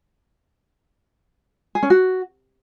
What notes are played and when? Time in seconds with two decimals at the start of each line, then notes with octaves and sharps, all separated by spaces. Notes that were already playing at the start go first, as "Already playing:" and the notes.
1.75 G#4
1.83 C#4
1.90 F#4